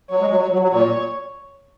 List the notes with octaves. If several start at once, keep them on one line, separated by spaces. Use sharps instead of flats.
F#3 C#5
G#3
F#3
F#3
F#3
F#3
A#2 C#5